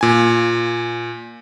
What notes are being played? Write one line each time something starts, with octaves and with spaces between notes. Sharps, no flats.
A#2 G#5